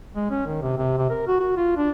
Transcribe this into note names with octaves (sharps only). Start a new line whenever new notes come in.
G#3
C#4
D#3
C3
C3
C3
A#4
F#4
F#4
F4
D4